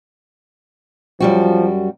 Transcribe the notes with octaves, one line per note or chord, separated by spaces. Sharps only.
F#2 F3 G3 F#4